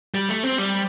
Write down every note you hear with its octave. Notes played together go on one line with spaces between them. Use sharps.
G3
A3
C4
G3